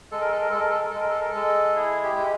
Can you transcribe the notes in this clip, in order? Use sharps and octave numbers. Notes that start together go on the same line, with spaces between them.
G#3 A4
A#4
A4
A#4
G#3 A4
A#4
A4
A#4
G#3 A4
A#4
A4
A#4
G#3 A4
E4 G#4
G4
G#3